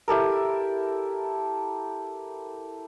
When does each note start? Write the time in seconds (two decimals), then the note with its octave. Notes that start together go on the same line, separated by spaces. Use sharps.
0.08 E4 G4 A4 A#4